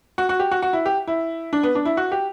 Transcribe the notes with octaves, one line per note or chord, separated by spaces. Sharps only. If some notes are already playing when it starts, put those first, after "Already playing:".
F#4
F#4
G4
F#4
F#4
E4
G4
E4
D4
B3
D4
E4
F#4
G4